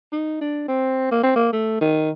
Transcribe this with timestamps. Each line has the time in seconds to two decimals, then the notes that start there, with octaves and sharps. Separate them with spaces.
0.13 D#4
0.41 D4
0.68 C4
1.11 A#3
1.23 C4
1.36 A#3
1.53 A3
1.81 D#3